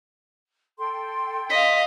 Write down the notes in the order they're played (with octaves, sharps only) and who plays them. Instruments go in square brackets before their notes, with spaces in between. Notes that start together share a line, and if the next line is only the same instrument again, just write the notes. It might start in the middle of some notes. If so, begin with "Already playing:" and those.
[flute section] A4 G5 C6
[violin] D#5 F5 [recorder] B6